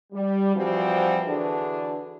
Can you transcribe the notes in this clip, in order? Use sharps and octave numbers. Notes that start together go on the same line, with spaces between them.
G3
E3 F3 G3 C4 F#4
D3 E3 D4 F#4 G#4 B4